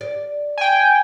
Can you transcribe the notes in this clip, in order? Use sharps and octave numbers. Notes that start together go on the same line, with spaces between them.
D5
G5 G#5